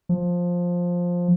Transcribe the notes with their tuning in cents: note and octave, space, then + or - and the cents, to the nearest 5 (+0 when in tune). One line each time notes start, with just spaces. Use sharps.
F3 +10